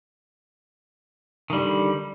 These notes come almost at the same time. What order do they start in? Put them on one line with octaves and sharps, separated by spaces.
D#3 G3 D3